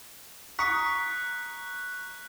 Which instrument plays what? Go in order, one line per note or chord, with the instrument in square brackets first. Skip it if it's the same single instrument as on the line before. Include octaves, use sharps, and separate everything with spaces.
[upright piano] A#5 C#6 D#6 [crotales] F#6 [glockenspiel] B6 C#7